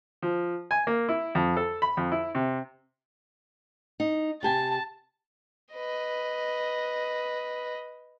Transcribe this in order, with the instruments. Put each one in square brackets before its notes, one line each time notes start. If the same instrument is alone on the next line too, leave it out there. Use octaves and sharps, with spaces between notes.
[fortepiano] F3
G#5
A#3
E4
F2
A4
B5
F2
E4
C3
[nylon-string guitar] D#4
[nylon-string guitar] C3 G4 G#5 [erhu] A5
[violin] B4 D#5